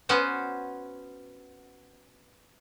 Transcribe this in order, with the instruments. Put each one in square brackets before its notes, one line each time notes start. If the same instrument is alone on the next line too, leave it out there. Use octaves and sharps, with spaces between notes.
[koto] B3 C#4 F#4 C5